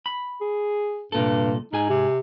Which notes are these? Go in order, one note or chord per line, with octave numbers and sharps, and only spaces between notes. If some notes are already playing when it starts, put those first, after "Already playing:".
B5
G#4
C2 G2 A#2 A4
G#2 D#4 G#4 G#5
C3